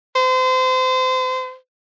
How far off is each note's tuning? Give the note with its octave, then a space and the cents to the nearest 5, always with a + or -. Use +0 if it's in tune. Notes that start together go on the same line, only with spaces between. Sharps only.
C5 -30